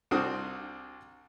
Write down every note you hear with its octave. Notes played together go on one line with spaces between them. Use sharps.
C2 C4 D4 F#4 D#6